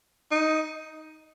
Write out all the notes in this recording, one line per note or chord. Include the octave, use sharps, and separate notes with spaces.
D#4